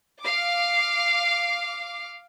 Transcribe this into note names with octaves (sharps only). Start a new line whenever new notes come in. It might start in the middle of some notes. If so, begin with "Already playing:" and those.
F5 D6